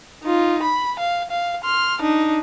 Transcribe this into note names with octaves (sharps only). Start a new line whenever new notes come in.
D#4 F4
B5
F5
F5
C6 F6
D4 D#4